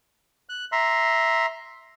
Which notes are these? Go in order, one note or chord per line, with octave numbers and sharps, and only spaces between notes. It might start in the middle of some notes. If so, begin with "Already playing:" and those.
F#6
E5 A#5 C6